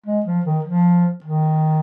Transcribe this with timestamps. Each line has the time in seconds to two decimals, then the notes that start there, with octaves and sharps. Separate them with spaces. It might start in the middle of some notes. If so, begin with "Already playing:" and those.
0.06 G#3
0.26 F3
0.46 D#3
0.65 F3
1.24 D#3